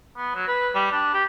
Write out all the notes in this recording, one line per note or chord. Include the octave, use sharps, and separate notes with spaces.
B3
F#3
B4
G3
D4
G4